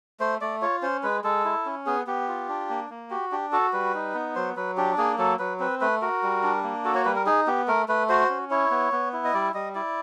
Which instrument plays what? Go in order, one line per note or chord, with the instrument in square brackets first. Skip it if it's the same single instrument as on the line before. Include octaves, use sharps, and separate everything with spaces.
[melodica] A3 C5
A3 D5
F4 C#5
C#4 C5
G#3 B4
G#3 A4
E4
C#4
B3 G#4
B3 G4
F4
D4
A#3
A#3
F#4 G4
D4 G4
F#4 A4
G3 B4
D#4
B3
F#3 C5
F#3 B4
D4 G4
A#3 G#4
F#3 A4
F#3 B4
C4 B4
A3 B4
F#4 A#4
G3
D4
A#3
F#4 A4
C#5
G3 B4
A#4
D#4 G#4
B3 G4
A3 A#4
A3 B4
F#4 C5
C#4
E4 C#5
B3
B3
E4
D#5
G3 D5
G3 D#5
E4 D5